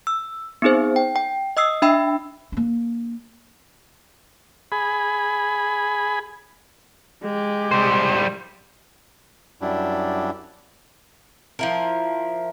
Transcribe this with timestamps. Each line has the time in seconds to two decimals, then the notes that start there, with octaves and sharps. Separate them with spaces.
0.07 E6
0.62 B3 C4 D#4 G#4 C5
0.96 G5
1.16 G5
1.57 D#5 D#6 E6 C7
1.82 D4 E5 G5 B5 E6
2.52 A#3 D4
4.72 G#4 B5
7.23 G#3 G4
7.72 G3 C5
9.61 F#2 G3 D4 E4
11.59 F3 E4 A#4